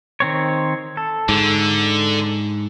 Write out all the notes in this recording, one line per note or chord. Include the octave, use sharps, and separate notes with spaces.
D#3 C4 C#5
A4
G#2 D3